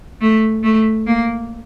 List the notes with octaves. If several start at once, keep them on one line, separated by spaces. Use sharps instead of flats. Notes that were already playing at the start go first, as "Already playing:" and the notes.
A3
A3
A#3